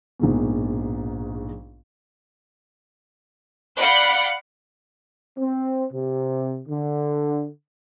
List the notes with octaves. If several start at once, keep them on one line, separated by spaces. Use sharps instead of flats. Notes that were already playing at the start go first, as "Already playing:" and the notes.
A#1 G#2 B2
D5 F5 F#5 B5 F#6 G6
C4
C3
D3